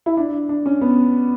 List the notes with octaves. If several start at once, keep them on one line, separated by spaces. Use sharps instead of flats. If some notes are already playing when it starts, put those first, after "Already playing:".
E4
D4
D4
C#4
B3